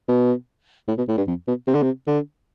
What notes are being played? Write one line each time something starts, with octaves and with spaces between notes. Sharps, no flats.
B2
A2
B2
A2
G2
F2
B2
C3
D3
C3
D3